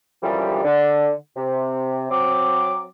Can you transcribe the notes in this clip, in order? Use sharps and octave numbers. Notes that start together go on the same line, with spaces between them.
F#2 D3 E3 F3 G3
D3
C3
F#3 C4 D6